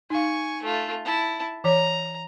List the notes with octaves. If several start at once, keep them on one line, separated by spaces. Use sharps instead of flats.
D#4 F5 G#5 C#6
A3 F4
E4 A5
E3 C#5 A#5